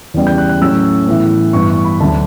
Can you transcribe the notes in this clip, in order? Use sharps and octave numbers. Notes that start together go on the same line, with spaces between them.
E2 C#3 G3 B3
G6
F#6
F#6
A2 F#3 A3 C#4 E6
A2 E3 B3
G2 E3 B3 C#6
C#6
B5
D2 D3 F#3 A5